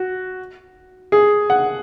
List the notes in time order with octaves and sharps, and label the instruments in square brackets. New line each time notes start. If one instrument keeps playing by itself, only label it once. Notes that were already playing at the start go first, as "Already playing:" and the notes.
Already playing: [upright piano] F#4
G#4
F#5